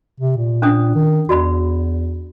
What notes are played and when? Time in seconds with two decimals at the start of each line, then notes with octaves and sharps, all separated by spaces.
0.20 C3
0.37 A#2
0.62 C#4 D4 D#6
0.95 D#3
1.29 E2 F#4 D5 B5